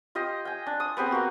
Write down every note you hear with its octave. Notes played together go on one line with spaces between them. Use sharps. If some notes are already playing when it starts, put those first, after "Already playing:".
F4 G4 D#5
G5 G#5
D4
D#6
B3 C4 G4 G#4
A#3 F#4